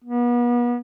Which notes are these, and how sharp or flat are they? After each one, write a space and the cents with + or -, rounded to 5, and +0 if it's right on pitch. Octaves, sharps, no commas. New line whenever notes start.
B3 -35